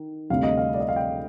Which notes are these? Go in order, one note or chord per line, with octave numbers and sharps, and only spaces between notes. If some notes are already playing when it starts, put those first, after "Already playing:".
Already playing: D#3
D2 C3 G3 F5
D#5
F5
D5
D#5
F5
G5